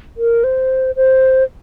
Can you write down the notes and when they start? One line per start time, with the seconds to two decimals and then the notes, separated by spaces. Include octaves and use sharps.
0.17 A#4
0.44 C5
0.96 C5